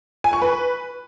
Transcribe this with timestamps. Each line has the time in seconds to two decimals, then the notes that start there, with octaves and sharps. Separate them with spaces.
0.24 G#5
0.33 C#6
0.42 B4